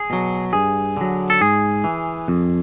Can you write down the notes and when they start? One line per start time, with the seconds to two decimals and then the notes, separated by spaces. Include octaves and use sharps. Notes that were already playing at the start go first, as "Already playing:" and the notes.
Already playing: G#4
0.10 B2 F#3
0.53 G2 G#4
0.97 D3 F#3
1.30 A4
1.41 G#2 G#4
1.84 E3
2.28 F2